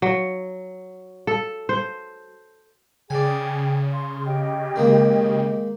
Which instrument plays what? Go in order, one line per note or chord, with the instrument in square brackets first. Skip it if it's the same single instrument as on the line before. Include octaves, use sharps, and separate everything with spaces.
[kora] F#3
A4
C5
[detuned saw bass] C#3 [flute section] G#4 G5 [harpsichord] D5 G#5
[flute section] C6
G4 D#5 G5
[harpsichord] D#3 G#3 A#3